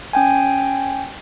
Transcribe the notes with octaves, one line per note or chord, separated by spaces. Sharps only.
C#4 G5 G#5